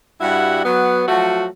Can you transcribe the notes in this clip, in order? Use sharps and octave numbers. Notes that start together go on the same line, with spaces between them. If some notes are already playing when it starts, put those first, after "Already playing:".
G2 G3 E4 F#4 F#5
F#3 B3
F3 F#3 A3 F#4